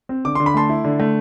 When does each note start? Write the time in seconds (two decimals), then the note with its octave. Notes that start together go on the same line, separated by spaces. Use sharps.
0.09 C4
0.25 D3 D6
0.35 D3 C6
0.46 B5
0.54 A3 A5 C6
0.69 E4
0.85 D3
1.00 A3